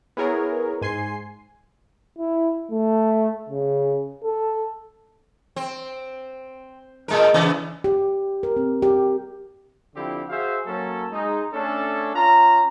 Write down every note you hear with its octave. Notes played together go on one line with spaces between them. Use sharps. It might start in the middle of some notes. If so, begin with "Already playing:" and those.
B3 E4 G#4 A#4 C#5
G#2 G#5 C6 C7
E4
A3
C#3
A4
C4
A#2 G#3 A#4
C#3 E3 B3
G4
A#4
C4
G4
D3 F3 C4 E4 G4
F#4 G#4 C5 E5 F5
F#3 A#3 C#4 A4
G#3 D#4
A3 C#4 D4 A4
C#4 F4 A#5